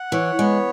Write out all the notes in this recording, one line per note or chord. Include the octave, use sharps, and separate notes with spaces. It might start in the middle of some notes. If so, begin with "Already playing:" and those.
Already playing: F#5
E3 C#5
G#3 B3